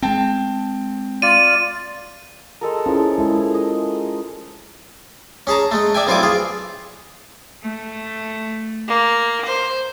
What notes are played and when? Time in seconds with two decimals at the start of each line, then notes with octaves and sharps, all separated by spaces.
0.02 G#3 C4 G5 A5
1.22 F4 D5 D#7
2.61 G#3 A4 A#4
2.86 F3 C#4 E4 G#4
3.18 G#3 E4 A4
3.54 D#5
5.47 C#4 G#4 A5 A#5
5.71 G#3 A3
5.95 D5 E5 G5 G#5
6.07 B1 C4 E4 F4 G#5 D6
6.23 F4 G#4
7.63 A3
8.87 A#3
9.46 C5